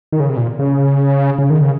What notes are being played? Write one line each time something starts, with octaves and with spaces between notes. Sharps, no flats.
D#3
C#3
C3
A#2
C#3
C#3
D#3
C#3